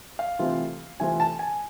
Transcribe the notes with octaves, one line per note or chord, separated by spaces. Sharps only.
F5
C3 E3 A3 C4 F4
C3 E3 A3 C4 F4 G#5
A5
G#5